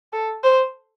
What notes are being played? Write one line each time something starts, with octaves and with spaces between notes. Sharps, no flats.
A4
C5